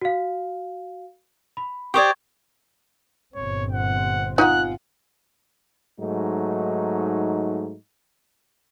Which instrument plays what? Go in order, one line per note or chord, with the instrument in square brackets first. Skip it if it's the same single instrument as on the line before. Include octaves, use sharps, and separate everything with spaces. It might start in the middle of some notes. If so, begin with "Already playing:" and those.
[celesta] F#4 F5
B5
[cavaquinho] G4 C5 D5 [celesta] C#6 D#6 G#6
[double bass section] G1 A#2 C4 [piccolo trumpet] C#5
[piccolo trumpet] F#5
[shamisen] D#4 G#5 [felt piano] F4 F#5 [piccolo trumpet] F#6
[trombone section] G#2 F#3 A3 D#4